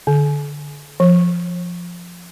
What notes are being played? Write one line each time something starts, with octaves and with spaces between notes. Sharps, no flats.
D3
F3